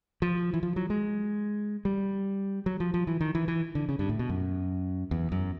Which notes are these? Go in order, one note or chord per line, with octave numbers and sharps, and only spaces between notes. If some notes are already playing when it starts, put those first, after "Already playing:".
F3
E3
F3
F#3
G#3
G3
F#3
F3
F3
E3
D#3
E3
E3
D3
C#3
G2
A2
B2
F#2
E2
F#2